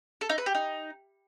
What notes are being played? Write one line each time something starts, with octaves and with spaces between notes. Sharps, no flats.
A4
D#4
B4
G4
D#4